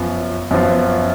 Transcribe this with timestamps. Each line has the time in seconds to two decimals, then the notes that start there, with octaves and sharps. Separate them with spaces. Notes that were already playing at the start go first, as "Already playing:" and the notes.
Already playing: F#2 F3 B3 F4
0.51 F#2 F3 B3 F4